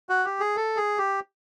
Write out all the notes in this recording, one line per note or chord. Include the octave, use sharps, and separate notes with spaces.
F#4
G4
G#4
A4
G#4
G4